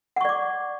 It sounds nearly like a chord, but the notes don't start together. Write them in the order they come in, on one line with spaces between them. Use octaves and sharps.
F#5 C#6 D5 D6